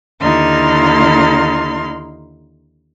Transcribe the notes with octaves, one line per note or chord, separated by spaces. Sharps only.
D#2 D3 D#4 E4 C6 F6